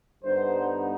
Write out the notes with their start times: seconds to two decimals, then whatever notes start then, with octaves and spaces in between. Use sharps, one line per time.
0.22 G2 D3 G3 B3 D#4 C5